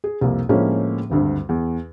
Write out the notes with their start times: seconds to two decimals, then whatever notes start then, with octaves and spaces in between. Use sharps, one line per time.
0.04 G#4
0.21 C2 F2 A#3
0.49 A2 D3 F3 G#3 A#3 C#4
1.10 G#1 D2 G2
1.49 E2